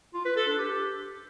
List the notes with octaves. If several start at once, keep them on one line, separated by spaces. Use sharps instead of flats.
F4
B4
A4
D4
G4